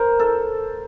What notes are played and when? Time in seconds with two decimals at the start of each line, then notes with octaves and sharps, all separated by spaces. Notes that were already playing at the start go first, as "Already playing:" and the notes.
Already playing: A#4 C5
0.19 A4